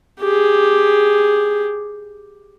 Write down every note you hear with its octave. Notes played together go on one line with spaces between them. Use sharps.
G4 G#4